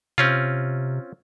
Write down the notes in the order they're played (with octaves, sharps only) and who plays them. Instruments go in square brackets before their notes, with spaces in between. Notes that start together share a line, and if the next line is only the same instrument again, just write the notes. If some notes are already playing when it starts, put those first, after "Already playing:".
[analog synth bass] C3 [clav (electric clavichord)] C4 C#4 F4